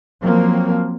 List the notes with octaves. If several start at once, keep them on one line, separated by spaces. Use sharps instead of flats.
F3 F#3 A#3 C4